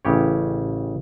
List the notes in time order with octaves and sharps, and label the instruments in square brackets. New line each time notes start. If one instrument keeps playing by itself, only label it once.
[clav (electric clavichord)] A1 C#3 G4 C#5